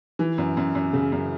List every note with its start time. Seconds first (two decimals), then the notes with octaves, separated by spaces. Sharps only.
0.19 E3
0.38 F#2
0.57 F#2
0.75 F#2
0.93 C#3
1.12 F#2